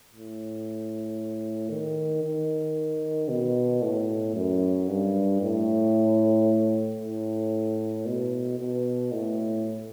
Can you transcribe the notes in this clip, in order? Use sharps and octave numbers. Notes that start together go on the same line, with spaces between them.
A2
D#3
D#3
B2
A2
F#2
G2
A2
A2
B2
B2
A2